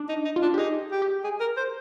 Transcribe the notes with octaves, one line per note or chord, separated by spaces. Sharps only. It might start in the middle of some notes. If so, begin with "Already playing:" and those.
Already playing: D4
D#4
D#4
F4
D4
G4
D#4 G#4
G4
G4
G#4
A#4
C5